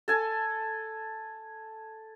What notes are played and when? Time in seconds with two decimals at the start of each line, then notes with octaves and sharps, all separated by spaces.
0.08 A4 G#5 A5